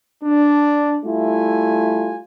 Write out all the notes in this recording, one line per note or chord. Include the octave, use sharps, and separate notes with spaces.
D4
G3 A3 E4 F4 G#5